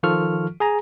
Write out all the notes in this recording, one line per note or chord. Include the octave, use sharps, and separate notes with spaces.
D#3 F3 F4 A4 C#6 F6
G#4 G#5 A#5